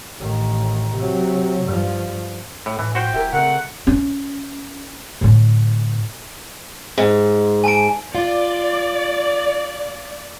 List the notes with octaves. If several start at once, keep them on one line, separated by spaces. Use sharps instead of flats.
A1 D#3
C3 F#3
G2 F3
A2
A2 E3
F3 F#4 C5 G5
D#1 E4 G4 A#4
C#3 A3 C4 A#4 F#5
C#4
A2 D3
G#2
G#5 A5 D7
F4 D5